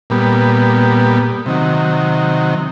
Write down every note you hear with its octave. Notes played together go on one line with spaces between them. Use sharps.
A#2 G3 B3
C3 D#3 F#3